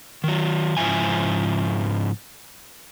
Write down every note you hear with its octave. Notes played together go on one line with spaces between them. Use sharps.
D#3 F#3
G#2 C#3 F3 E4 G#5